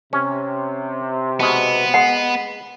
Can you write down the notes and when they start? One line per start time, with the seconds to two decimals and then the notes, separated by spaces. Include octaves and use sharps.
0.13 C3 C#4
1.40 B2 G#3 B3
1.94 G#3 F#5